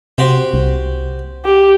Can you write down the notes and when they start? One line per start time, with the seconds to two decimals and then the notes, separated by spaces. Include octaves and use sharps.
0.18 C3 F#4 G4 C5
0.54 C2
1.45 G4